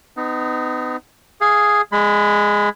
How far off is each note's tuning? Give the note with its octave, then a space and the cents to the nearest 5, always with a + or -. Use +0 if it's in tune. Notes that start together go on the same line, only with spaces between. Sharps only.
B3 +35 D#4 -15
G#4 +0 F5 +0
G#3 +0 B5 +30